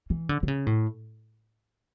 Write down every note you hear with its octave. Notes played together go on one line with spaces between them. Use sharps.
E3
D3
D3
C#3
A2